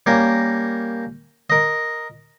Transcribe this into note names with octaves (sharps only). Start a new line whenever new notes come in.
G3 A#3 C#4 A#4
A#4 D#5